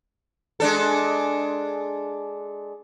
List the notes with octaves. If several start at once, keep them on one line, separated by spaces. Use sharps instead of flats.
G#3 D4 A4